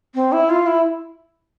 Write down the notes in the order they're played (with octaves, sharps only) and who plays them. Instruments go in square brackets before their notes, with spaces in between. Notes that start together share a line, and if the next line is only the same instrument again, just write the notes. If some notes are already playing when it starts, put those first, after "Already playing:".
[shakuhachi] C4
E4
F4
E4